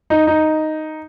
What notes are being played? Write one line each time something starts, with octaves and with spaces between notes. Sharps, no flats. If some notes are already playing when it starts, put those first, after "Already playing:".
D#4
D#4